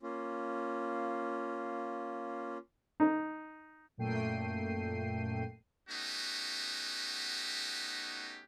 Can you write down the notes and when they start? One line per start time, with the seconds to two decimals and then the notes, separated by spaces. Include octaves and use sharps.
0.03 A#3 C#4 F4
3.00 D#4
3.97 F#2 A#2 A3 G5 C7 D#7
5.89 A3 B3 C#4 D#4 F#4 G4